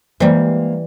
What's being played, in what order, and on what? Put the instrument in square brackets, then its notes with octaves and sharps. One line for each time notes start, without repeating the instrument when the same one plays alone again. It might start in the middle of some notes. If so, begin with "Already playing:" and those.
[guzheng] E3 G3 [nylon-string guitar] G#3 A#3 C5